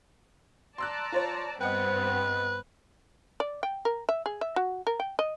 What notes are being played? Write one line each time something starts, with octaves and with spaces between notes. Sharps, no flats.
D5 A5 A#5 C6 E6 F#6
F4 C5 C#5
G2 B3 C4 B4 D#5 F#5 G5
D5
G5
A#4
E5
G#4
E5
F#4
A#4
G5
D#5